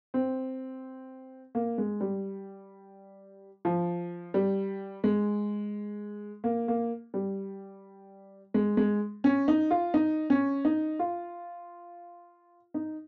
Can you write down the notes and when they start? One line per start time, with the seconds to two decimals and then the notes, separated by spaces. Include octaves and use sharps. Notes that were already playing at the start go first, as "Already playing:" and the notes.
0.14 C4
1.55 A#3
1.78 G#3
2.01 G3
3.65 F3
4.34 G3
5.04 G#3
6.44 A#3
6.68 A#3
7.14 G3
8.54 G#3
8.77 G#3
9.24 C#4
9.48 D#4
9.71 F4
9.94 D#4
10.30 C#4
10.65 D#4
10.99 F4
12.74 D#4